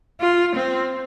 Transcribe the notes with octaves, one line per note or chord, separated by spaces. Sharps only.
F4
C4